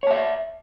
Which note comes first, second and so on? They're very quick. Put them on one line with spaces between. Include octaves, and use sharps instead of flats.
C#5 A5 E5 D5